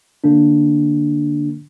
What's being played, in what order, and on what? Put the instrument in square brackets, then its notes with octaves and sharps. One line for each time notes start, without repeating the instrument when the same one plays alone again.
[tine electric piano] D3 A#3 D4